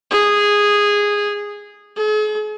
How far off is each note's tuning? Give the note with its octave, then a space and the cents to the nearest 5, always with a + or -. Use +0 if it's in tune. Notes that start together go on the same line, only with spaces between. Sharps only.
G#4 -10
G#4 +45